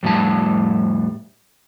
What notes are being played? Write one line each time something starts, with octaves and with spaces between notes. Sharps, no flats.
F2 A2 G3 A5